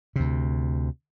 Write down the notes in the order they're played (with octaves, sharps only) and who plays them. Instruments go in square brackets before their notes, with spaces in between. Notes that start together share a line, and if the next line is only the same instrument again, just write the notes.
[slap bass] D2 C3